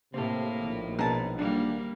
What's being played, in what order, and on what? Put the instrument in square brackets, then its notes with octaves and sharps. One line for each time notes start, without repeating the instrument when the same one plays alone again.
[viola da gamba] A2 A#3 [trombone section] C3 [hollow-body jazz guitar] C4 A4
[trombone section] A#1 D#3
[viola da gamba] B2 [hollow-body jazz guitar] G#3 C#4 D#4 [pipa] A#4 A5
[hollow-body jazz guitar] D3 D4 [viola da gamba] G3 A#3